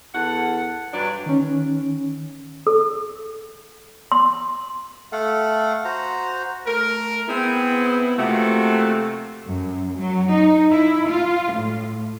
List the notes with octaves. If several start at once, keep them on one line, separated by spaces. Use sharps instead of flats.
E2 A4 F#5
G2 F#3 D4 B4 D5
D#3 C#4
A4
C6
A3 A4 F5 F#5
F#4 C5 A#5
A3 A#4
B3 C4 E4 G#4
C3 F3 A3 A#3 F#4
F#2
F#3
D#4
E4
F4
A2